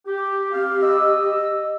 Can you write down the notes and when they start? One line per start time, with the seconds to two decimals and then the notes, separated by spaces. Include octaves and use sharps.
0.07 G4
0.54 C4 G4 F5
0.82 D#5 E6